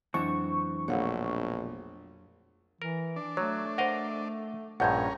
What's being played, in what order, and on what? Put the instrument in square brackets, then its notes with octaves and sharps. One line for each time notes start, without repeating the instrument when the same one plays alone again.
[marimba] F2 F#3 D4 [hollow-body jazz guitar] E3 G#3 C4 [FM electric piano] C#6
[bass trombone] A#1 [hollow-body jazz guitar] B2 A3 [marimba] C#5 F5 F#5
[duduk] E3 [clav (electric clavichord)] A#4
[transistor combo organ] D4
[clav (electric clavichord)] F#3 [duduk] A3 [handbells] C#5
[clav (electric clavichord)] A#4 D#5 F5 [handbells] C5 F#5
[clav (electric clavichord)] A#1 G2 A#2 [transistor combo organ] C#4 A#4 [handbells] F#5 G6 G#6